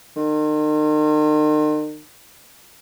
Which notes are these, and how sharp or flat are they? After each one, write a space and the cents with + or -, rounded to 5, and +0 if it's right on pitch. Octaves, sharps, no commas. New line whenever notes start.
D#3 -40